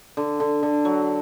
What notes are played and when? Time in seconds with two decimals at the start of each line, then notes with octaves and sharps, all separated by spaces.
0.17 D3
0.40 D3
0.63 D3
0.85 F#3